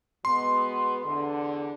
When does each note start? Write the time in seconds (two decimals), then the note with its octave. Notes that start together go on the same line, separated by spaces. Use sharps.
0.25 B2 G#3 B3 C6
1.04 E2 D3